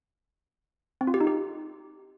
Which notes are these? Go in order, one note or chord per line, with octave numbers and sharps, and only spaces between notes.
C4
F4
G4
D#4
G4